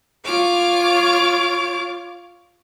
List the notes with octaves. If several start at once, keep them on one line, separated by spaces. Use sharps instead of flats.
F4 C#5 D6 F6